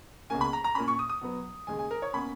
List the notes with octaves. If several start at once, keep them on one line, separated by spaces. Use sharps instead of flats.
C#2 B2 A#3 C#4 G#5
B5
A#5
A#5
A#2 A#3 C#4 B5
C#6
D#6
D#6
B2 F#3 B3
D#2 C#3 G#3 G#5
G#5
A#4
C#5
B2 A#3 C#4 B5